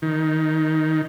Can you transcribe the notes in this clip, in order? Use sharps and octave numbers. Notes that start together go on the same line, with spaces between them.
D#3